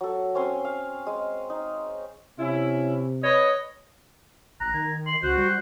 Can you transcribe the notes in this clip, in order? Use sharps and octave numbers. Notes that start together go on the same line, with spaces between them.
F#3 A4
C4 C#4 G#5 C6
F5
G#3
D#4
C3 C#4 E4
B4 C#5 D#5
A#1 A#5 F#6
D#3 G#6
C6 F#7
C#2 F#4 C5 F#6
G3